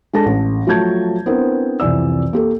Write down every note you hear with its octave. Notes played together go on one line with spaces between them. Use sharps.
G#3 D4 A4 A5 A#6
A1
F3 F#3 A3 A5 G6 G#6
B3 C4 D4 E4 A#4 C5
C2 F2 E3 D5 E6
A#3 G4 A4